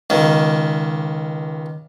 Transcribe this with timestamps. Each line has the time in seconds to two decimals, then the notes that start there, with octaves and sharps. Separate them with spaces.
0.10 C#2 D#3